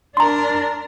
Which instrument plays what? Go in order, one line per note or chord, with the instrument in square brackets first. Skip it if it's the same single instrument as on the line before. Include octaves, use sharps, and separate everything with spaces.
[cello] D4 A#4 [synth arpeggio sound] A#5 C6